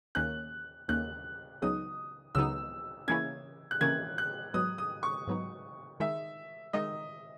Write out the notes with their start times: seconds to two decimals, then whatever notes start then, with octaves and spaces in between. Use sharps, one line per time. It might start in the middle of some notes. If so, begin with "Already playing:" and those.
0.15 D#2 D#3 A#3 C#4 F#6
0.88 D#2 D#3 A#3 C#4 F#6
1.62 C#2 C#3 F#3 B3 D#4 D#6
2.35 C#2 C#3 F#3 B3 D#4 E6
3.08 C#3 E3 A#3 C#4 E4 G#6
3.71 F#6
3.81 C#3 E3 A#3 C#4 E4 G#6
4.18 F#6
4.54 G#2 F#3 B3 D#4 D#6
4.78 D#6
5.03 C#6
5.27 G#2 F#3 B3 D#4
6.00 D#3 G#3 D#4 E5
6.73 D#3 G#3 D#4 D#5